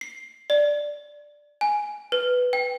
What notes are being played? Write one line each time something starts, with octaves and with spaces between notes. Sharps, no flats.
C7
D5
G#5
B4
G5